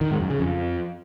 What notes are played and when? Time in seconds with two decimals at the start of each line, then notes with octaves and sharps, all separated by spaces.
0.01 D#3
0.11 G#2
0.20 F#2
0.30 C#3
0.40 F2